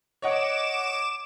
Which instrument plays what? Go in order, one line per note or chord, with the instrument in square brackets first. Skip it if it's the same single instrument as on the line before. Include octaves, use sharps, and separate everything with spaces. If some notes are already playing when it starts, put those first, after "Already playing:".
[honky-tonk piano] C#5 D#5 F#5 [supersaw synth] D6 E7